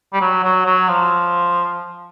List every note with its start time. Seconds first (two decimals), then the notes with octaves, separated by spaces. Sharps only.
0.13 G3
0.21 F#3
0.43 F#3
0.66 F#3
0.88 F3